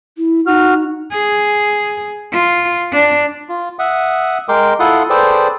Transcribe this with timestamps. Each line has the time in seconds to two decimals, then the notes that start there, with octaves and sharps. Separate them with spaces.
0.18 E4
0.47 D#4 F#4 F6
1.12 G#4
2.32 F4
2.93 D4
3.49 F4
3.79 E5 F#5 D#6
4.49 G#3 A#4 G5 C6 D6
4.80 E4 F4 A4 F#5 C6 D#6
5.10 G#4 A4 B4 C5 D5 G5